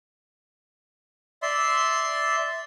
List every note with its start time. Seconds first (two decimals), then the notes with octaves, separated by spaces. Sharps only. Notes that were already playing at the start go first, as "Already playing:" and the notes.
1.42 D5 E5 C6